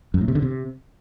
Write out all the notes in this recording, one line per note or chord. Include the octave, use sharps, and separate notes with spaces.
F#2
A2
C3
D3
C3